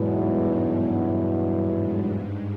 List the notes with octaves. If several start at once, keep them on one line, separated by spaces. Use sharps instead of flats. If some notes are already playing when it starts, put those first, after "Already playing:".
Already playing: E2 G#2 B2 F#3 B3 E4
G2
G#2